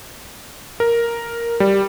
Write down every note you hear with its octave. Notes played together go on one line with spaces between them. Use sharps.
A#4
G3